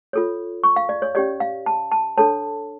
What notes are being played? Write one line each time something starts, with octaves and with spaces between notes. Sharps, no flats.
F4 A4 C#5
C#6
F5
D5
C#5
C#4 G4 C#5 D5
F5
A5
A5
D4 A4 C#5 A5